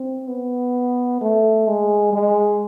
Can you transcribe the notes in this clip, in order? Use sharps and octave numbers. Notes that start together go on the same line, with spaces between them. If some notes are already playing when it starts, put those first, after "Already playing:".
Already playing: C4
B3
A3
G#3
G#3